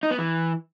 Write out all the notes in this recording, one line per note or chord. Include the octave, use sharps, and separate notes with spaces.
D#4
B3
E3